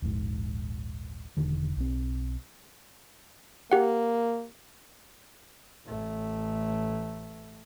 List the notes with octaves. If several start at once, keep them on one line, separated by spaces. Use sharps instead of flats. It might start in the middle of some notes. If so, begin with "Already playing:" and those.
D#1 A#1 G#2
E1 E2 D3 D#3
B1 C4
A#3 G4 F#5
A1 A3